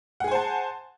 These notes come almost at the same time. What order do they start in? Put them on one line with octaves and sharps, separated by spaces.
F#5 G#4 G#5 C5 A5